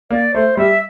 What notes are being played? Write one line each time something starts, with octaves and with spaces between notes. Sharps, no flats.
A#3 D5
A3 C5
G3 E5